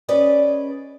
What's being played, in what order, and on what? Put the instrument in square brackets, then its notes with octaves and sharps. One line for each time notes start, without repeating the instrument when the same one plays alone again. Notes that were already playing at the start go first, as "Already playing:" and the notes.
[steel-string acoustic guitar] C#4 G#4 B4 D5 D#5